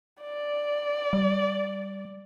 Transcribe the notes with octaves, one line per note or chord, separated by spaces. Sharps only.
D5
G3